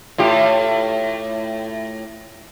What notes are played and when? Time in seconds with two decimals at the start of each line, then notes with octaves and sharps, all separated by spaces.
0.18 A2 F4 G4